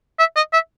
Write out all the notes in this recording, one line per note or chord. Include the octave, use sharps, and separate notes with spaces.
E5
D#5
E5